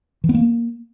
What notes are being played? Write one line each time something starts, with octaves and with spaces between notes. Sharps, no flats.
E3
B3
A#3